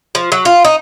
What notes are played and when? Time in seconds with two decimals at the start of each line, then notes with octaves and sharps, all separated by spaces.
0.15 F3
0.32 F#3
0.45 F4
0.65 D#4